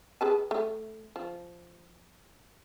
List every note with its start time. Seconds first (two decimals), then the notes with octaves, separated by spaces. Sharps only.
0.21 G#4 B4 A5
0.51 A3
1.16 F3